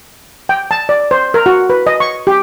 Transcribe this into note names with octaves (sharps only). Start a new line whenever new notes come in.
G5
A5
D5
C5
A#4
F#4
B4
D#5
C#6
G4